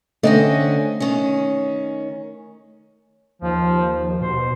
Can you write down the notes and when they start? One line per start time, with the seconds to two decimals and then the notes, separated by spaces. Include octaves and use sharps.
0.23 D3 A3 C4 C#4 D#5
1.00 D#3 C#4
3.42 D#2 F3
4.21 B2 C5